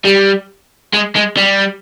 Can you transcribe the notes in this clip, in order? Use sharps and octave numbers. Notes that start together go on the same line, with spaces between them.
G3
G#3
G#3
G3